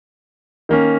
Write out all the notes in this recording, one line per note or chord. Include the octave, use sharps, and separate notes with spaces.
D#3 A#3 C#4